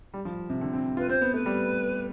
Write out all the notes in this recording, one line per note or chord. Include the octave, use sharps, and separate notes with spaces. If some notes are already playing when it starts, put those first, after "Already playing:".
G3
F3
C3
D3
C4
F4 B4
C4 C5
B3
A3 B4
G3